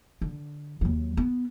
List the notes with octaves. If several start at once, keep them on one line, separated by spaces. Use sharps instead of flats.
D3
D#2 F#3
B3